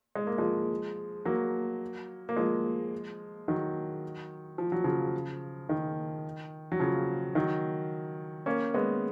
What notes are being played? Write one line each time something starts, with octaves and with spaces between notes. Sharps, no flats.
G#3
A#3
F3 G#3
F#3 A#3
A#3
F3 G#3
D#3 F#3
F3
F#3
C#3 F3
D#3
F#3
C#3 F3
D#3 F#3
A#3 C#4
G#3 B3